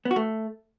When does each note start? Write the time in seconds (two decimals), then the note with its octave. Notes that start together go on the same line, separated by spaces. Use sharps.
0.05 B3
0.11 F#4
0.16 A3